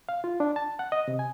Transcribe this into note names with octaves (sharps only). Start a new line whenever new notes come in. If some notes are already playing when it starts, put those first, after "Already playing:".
F5
F4
D4
A5
F#5
D#5
C3
G#5